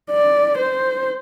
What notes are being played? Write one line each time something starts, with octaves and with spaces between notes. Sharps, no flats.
D5
C5